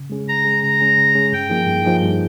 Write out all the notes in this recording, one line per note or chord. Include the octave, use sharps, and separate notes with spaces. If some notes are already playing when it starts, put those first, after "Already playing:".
Already playing: C#3
G#3 C#4 G#4
C#3 A#5
G#3 C#4 G#4
C#3 A#5
G#3 C#4 G#4
C#3
G#3 C#4 G#4
G2 G5
F3 A#3 D#4 G#4
G2
F3 A#3 D#4 G#4
G2